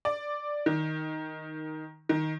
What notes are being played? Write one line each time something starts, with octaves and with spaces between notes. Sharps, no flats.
D5
D#3
D#3